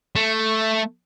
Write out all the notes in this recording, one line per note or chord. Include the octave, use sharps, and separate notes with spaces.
A3